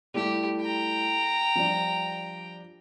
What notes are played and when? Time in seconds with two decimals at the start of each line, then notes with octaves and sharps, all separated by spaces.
0.14 G3 A3 E4 G4
0.61 G5 A#5
1.55 F3 G3 D4